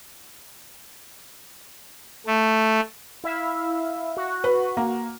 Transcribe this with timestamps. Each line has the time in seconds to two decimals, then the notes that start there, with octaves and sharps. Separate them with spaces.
2.26 A3
3.24 E4 E5 F5
4.17 F#4
4.44 B4
4.77 A#3